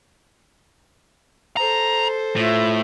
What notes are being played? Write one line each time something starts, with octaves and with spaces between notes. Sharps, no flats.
A4 C5 A#5
A2 F4 E5